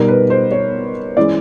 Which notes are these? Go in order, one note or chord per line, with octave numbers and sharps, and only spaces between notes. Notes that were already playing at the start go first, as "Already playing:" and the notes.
Already playing: B2 G3 B3 D#4 A#4
B4
C5
C#5
E3 G#3 C#4 E4 D5